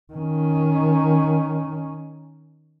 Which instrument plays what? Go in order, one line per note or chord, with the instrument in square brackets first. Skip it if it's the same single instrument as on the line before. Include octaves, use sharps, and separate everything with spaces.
[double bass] D#3 C#4